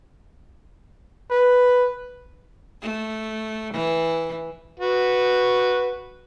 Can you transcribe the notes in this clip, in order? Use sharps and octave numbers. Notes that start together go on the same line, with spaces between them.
B4
A3
E3
F#4 B4